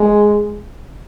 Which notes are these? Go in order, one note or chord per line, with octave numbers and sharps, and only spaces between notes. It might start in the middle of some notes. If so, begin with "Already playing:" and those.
Already playing: G#3